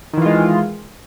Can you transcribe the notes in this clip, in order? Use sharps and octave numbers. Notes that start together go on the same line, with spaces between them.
D#3 E3 G#3 F4